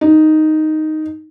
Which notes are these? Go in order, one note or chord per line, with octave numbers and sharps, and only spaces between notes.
D#4